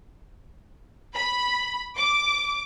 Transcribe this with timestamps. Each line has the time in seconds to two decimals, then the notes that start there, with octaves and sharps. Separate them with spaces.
1.16 B5
1.97 D6